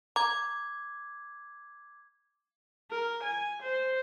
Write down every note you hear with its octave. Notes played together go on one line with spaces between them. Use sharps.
A#5 D6 G#6
A#4
G#5
C5